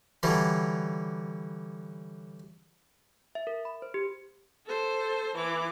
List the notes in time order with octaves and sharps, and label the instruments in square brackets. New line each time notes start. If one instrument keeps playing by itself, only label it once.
[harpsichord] D3 E3 F#3 G3
[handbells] E5
A#4
B5
C5
G4
[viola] A4 C5
E3 D6